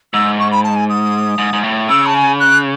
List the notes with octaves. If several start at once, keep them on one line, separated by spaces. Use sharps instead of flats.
G#2 E6
C#6
B5
A5
G#5
D#6
G#2
G#2
A2
C#3 E6
A5
G#5
F#6